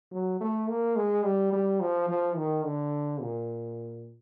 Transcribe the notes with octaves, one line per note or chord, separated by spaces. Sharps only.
F#3
A3
A#3
G#3
G3
G3
F3
F3
D#3
D3
A#2